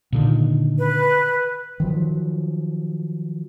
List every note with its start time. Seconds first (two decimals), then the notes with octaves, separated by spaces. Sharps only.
0.13 A#2 D3 D#3
0.79 B4
1.80 D#3 F3 F#3